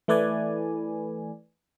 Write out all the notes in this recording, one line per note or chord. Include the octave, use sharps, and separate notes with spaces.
E3 A3 B4 D5 G#5